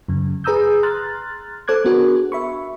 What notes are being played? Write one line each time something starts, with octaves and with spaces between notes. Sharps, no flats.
F#2 C#3
G#4 B4 A#5 D#6 E6 G6
A#5 C6 F6 F#6 A6
A4 C5 D6 F#6 G#6
B3 D4 F#4 G#4 A#4
E5 B5 C#6